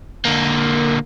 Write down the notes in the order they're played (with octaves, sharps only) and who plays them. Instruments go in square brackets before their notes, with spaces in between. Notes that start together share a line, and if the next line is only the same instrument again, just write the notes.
[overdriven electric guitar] D3 A#3